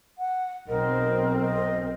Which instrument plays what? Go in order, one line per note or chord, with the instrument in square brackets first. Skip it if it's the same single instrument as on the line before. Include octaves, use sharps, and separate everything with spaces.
[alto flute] F#5
[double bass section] B1 C4 [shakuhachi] A#4 [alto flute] D#5
[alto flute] D#5